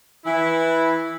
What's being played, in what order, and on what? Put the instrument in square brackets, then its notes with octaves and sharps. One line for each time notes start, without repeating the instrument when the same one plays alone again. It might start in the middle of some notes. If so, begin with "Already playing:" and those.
[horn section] E3 E4